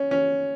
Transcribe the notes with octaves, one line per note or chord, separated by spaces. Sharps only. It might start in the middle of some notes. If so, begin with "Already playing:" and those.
Already playing: C#4
C#4